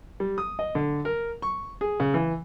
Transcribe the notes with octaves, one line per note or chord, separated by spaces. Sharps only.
G3
D#6
D#5
D3
A#4
C#6
G#4
C#3
E3